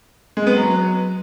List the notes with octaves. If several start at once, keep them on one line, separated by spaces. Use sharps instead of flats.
G#3
B3
F#3